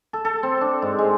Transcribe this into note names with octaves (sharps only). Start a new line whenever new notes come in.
A4
A4
C4
D4
G#2
G#3